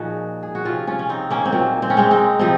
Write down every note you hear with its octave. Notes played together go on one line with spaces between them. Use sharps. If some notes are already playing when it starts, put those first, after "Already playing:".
Already playing: A#2 F3 D#4 F#4 G#4
G#4
F#4
C3 F3 C#4 F4
C#4 F4
C#4
C4 D#4
A#3 C#4
C4
A#2 F#3 A#3
C4
C#4
G#3 C4
C4 D#4
C3 F3 C4 D#4